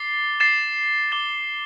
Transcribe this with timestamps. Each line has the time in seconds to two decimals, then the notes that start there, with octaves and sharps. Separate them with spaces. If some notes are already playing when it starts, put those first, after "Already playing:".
Already playing: D6 A6 C7 G7
0.40 A6 C7 E7
1.12 D6 A6 E7 G7